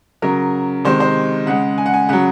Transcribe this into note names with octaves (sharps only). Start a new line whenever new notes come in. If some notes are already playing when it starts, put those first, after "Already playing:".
C#3 F#3 A#4
C3 D#3 G#3 C5
C5
C#3 G#3 F#5
G#5
F#5
G#5
C#3 F#3 F#5